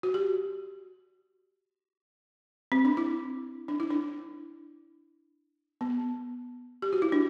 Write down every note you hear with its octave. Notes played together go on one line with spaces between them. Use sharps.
F#4
G4
C4
D4
E4
D4
E4
D4
B3
G4
F#4
E4
D4